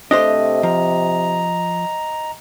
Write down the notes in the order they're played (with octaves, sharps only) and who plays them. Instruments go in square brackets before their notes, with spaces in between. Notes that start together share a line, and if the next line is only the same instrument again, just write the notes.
[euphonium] C3 [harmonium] A3 [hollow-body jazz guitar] D4 G4 C5 [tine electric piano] D#5
[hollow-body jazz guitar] F3 [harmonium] A#5